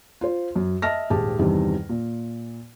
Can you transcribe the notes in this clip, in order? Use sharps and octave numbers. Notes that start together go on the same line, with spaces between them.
F4 C5
F#2
D#5 E5 A5 F6 A#6
D#1 G#1 G4 G#4 A5
E2 G2 C3 D#3
A#2